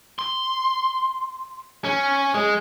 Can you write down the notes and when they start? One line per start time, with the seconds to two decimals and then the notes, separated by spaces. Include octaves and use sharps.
0.19 C6
1.85 C#4
2.34 G#3